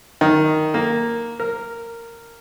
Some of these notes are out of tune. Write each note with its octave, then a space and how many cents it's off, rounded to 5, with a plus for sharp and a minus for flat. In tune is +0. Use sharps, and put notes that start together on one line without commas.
D#3 +0
A#3 +0
A#4 -10